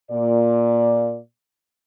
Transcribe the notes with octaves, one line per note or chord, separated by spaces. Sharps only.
A#2 D5